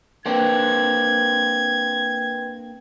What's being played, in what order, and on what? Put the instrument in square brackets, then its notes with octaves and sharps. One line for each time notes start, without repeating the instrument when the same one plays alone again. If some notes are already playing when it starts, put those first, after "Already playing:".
[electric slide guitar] A#3 C4 D4 [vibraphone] B4 G5 [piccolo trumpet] G#6